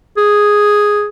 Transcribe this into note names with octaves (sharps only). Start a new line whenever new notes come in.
G#4